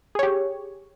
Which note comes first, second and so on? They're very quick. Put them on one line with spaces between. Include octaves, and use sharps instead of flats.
G#4 C#5 G4